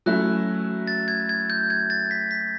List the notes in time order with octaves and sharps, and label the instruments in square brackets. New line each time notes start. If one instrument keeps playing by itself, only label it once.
[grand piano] F#3 A3 C#4 E4 [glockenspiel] F#6
[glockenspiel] A6
G#6
G#6
G6
G#6
A6
B6
B6